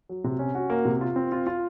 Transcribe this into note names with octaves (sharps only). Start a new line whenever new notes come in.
F#3
C3
C#4
F#4
A#3
C3
F4
C4
F4
F4